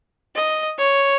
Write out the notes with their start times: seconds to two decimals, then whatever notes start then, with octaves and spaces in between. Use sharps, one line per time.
0.35 D#5
0.78 C#5